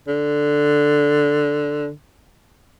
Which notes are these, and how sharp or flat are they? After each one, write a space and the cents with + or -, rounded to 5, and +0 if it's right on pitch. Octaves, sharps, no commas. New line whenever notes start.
D3 +0